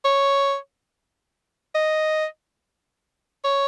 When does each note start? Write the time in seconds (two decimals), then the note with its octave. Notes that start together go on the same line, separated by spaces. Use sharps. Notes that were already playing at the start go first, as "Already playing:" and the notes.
0.05 C#5
1.75 D#5
3.44 C#5